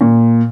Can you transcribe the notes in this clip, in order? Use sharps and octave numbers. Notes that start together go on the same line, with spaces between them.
A#2